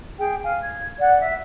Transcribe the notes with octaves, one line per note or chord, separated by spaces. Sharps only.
G#4 G5
F5 G#5
G#6
D5 F#5
E5